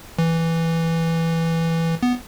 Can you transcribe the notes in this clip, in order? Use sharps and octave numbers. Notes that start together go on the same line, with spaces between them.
E3
B3